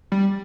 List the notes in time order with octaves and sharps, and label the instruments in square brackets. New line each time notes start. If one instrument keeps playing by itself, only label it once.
[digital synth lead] G3